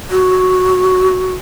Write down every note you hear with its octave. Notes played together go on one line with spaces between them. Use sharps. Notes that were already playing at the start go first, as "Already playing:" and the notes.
F#4